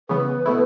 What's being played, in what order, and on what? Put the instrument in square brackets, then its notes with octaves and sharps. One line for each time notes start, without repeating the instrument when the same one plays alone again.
[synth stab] C#3 E3 B3 [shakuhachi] B4
[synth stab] B2 A3 E4